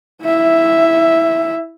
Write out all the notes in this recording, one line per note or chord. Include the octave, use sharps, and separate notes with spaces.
E4 E5